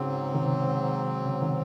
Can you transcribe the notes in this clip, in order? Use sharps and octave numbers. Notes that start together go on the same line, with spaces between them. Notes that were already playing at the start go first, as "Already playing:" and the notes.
Already playing: G#2 C#3 F#3 C4
C3 D#3
C#3
C3 D#3